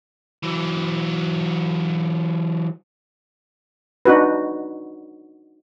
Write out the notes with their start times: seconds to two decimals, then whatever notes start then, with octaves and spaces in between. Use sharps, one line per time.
0.43 E3 F#3
4.05 D4 D#4 F#4 B4